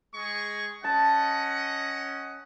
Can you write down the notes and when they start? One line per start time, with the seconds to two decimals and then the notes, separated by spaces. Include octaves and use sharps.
0.15 G#3 G#4 C#6
0.84 C#4 D#5 F#5 A5